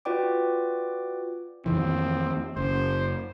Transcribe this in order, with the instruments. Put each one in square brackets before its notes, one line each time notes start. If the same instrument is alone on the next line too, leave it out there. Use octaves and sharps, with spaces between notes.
[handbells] F4 F#4 B4 D5 G5 D6
[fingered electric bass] F2 D#3 E3 [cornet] C4
[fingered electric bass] F#1 [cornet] C5